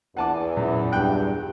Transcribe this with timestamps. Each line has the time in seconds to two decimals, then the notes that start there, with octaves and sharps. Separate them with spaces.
0.17 E2 F#5 G#5 A5 D6
0.57 F#2 A#2
0.92 G2 G5 F#6